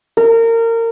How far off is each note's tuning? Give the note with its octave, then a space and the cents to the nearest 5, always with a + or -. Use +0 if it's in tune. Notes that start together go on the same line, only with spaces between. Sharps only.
A#4 -25